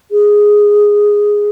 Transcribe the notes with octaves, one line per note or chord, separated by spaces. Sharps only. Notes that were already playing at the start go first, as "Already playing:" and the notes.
G#4